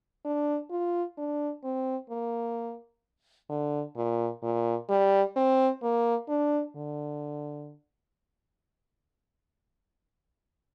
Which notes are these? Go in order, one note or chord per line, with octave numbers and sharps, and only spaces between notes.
D4
F4
D4
C4
A#3
D3
A#2
A#2
G3
C4
A#3
D4
D3